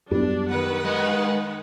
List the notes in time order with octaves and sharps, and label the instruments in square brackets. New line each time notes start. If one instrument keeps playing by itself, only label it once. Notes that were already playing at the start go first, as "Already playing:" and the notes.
[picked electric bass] F#2 B3 [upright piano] G3 [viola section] D4
[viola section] D#3 B4 F#5
[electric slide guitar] G#3 D#5